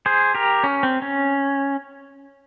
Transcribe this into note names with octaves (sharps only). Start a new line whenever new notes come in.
G#4 C5
G4 A#4
C#4
C4
C#4